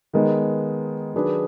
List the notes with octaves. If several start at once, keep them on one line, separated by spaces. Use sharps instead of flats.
D#3 G#3 B3
D#3 F#3 D4 G#4 B4